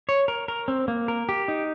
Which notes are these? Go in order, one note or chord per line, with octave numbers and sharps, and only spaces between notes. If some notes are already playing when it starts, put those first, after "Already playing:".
C#5
A#4
A#4
C4
A#3
A#4
G4
D#4